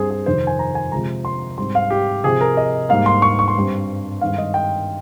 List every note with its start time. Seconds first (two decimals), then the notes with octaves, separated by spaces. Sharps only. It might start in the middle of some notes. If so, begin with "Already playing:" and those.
Already playing: G2 G3 C4 G#4 C5
0.10 G#4
0.26 F2 C3 D#3 C5
0.47 G#5
0.59 A#5
0.75 G#5
0.92 C3 F3 G#3 A#5
1.25 C6
1.57 G#2 G3 C4 C6
1.75 F5
1.90 G4
2.24 C3 F3 C4 G#4
2.41 A#4
2.57 D#5
2.89 G#2 G3 A#3 F5
3.06 C6
3.22 C#6
3.39 C#6
3.48 C6
3.56 G2 G3 C4
4.21 G2 D#3 G#3 C4 F5
4.38 D#5
4.54 G5